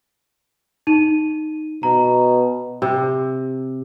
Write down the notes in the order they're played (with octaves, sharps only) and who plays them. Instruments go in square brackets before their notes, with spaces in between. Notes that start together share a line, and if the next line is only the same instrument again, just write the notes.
[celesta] D#4 D#7
[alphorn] B2 [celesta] A#5
[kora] C3